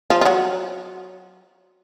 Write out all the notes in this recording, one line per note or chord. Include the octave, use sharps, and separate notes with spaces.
F3 F4
F4
F#3 F#4